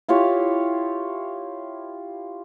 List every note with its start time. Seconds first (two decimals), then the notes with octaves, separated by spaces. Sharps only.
0.08 E4 F4 G4 C#5